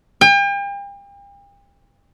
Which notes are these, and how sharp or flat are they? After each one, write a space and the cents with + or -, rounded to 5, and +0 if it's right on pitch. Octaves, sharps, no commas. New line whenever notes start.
G5 +40